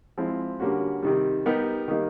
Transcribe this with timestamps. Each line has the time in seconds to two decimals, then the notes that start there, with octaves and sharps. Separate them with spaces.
0.18 F3 G#3 C4 E4
0.60 D3 G3 A#3 C#4 F#4
1.02 C3 D#3 G3
1.46 G3 B3 D#4 G4 A#4
1.88 D#3 G3 A#3 D#4